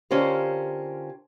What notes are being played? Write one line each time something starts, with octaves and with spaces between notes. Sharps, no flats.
D3 C#4 F4 G4 A#4 C5